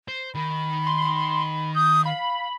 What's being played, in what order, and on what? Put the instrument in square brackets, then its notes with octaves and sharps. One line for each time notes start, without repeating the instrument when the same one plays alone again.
[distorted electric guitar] C5
[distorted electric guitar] D#3 D#4 [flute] B5
[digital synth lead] C6
[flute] D#6 [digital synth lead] G6
[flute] F5 [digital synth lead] B5